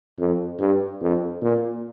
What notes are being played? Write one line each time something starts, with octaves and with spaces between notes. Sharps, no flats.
F2
G2
F2
A#2